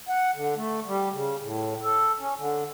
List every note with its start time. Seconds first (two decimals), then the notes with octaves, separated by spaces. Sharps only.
0.08 F#5
0.34 D3
0.57 A3
0.86 G3
1.13 C#3
1.42 A2
1.83 A4
2.20 C#4
2.38 D3